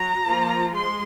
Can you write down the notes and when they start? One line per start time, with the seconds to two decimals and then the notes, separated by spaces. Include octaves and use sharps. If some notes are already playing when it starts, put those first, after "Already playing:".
Already playing: F#3 A#5
0.25 F3 A#3 F4
0.74 G#3 C6